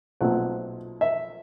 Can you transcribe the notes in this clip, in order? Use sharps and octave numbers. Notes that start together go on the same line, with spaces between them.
B1 A#2 F3 A3 C4 F#5
E5